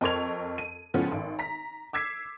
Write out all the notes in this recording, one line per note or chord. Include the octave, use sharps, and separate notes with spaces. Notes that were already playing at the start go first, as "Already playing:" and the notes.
F2 C4 A#4 C#6 G#6 F7
D#7
A2 C#3 F3 G#3 B3 C#4
G#1
A#5 B6
D6 E6 G#6 B6 C7